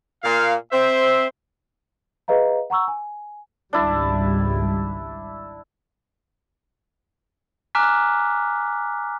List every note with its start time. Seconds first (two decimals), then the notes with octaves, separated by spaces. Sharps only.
0.24 A#2 F5
0.73 C4 C5 E5
2.28 G#4 B4 D#5 F5 A#5
2.70 F#5 A#5 C#6 E6
2.88 G#5
3.73 G#1 C#2 G3 D4 E4 A5
7.75 G#5 A#5 D6 F6 F#6 B6